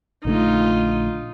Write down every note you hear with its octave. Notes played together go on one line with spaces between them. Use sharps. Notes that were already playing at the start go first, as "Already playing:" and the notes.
A#1 D3 A3 D#4 F4